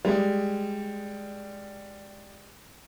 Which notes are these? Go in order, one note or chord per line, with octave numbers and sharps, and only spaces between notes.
G3 G#3